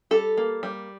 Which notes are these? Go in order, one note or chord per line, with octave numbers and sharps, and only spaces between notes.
G3 A4
A#3
G3